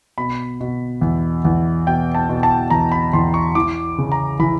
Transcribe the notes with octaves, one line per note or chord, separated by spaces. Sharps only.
B2 B5
B2
E2
E2
B2 G5
A5
B2
A5
E2 A#5
B5
E2 C6
C#6
E3 D6
C#3
A#5
E3 B5